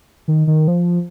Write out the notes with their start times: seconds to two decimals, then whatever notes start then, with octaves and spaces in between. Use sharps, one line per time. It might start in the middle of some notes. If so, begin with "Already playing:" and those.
0.28 D#3
0.47 D#3
0.68 F3